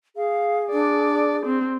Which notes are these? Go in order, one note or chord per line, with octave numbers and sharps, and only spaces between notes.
G#4 F5
D4 D5
C4